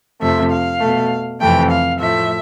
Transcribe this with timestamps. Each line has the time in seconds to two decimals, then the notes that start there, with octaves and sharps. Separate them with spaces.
0.21 F2 C3 F3 A3 E5
0.51 F5
0.81 B2 A3
1.41 F2 C3 E3 A3 G5
1.70 F5
2.00 A2 F3 A3 E5